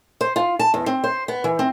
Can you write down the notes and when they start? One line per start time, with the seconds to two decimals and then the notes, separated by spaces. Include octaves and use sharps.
0.21 C5
0.36 F4
0.59 A5
0.74 E2
0.86 C4
1.04 C5
1.28 B3
1.44 E3
1.59 C4